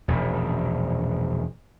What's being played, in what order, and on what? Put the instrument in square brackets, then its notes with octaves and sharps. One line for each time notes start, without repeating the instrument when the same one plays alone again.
[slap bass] E1 A#1 F#2